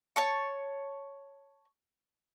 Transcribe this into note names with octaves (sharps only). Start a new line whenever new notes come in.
C#5 A5 C#6